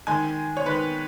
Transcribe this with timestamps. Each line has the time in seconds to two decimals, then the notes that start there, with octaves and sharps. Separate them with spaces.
0.07 D#3 G#3 G#5
0.57 C#5
0.66 D#3 G#3 B4